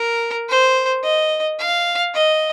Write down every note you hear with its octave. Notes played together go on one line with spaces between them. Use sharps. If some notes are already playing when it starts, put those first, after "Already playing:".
Already playing: A#4
C5
D#5
F5
D#5